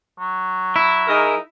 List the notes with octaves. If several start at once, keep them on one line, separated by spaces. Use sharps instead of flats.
F#3
E4
D#4 G#4 A#4